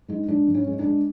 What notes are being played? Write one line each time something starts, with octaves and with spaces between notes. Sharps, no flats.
G#3 D#4
G#3 D4
G#2
C#4
G#3
D4
G#3